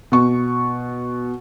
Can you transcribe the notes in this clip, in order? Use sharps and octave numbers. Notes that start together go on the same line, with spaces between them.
B2 C#6